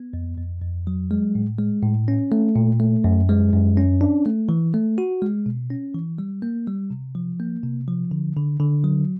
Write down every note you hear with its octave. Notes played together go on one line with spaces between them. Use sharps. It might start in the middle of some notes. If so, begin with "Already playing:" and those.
Already playing: B3
F2
F2
F2
F#3
G#3
A2
G#3
A2
C#4
A3
A#2
A3
F#2
G#3
F#2
C#4
D4
A3
E3
A3
F#4
G#3
B2
C#4
E3
G3
A#3
G3
C3
F3
A#3
C3
F3
D3
D3
D3
F#3